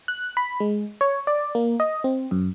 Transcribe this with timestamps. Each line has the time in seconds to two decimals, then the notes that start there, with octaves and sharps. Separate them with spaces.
0.08 F#6
0.37 B5
0.60 G#3
1.01 C#5
1.27 D5
1.55 A#3
1.80 D#5
2.04 C4
2.31 F#2